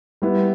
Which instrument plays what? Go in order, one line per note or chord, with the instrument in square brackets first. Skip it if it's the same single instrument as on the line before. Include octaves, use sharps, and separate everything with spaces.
[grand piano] G3 B3 E4